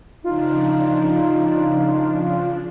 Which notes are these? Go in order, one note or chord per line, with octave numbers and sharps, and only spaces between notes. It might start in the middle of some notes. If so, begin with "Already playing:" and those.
C#3 F3 D4 D#4 F4